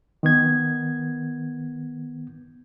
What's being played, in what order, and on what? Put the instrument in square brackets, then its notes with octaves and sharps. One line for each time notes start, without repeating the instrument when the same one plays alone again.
[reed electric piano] D#3 B3 G#6